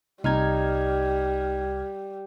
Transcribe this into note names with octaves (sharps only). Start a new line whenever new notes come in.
C2 G3 D#4 G4 F6 G#6